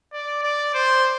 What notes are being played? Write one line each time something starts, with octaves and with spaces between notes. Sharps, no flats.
D5
D5
C5